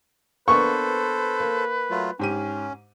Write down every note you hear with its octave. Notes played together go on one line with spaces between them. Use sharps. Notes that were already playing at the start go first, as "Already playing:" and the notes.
A#3 B3 D4 A4 B4 C5 C#6
A#3
F#3 A3 F4
G#2 C#4 G4 D#7